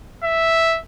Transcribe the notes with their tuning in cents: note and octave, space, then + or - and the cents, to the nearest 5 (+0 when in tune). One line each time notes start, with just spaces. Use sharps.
E5 -5